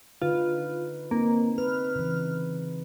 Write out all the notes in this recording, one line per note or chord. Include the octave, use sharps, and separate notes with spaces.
D3 D#4 F4 B4
A#3 C4 D#4
B4 F6
C#3 E3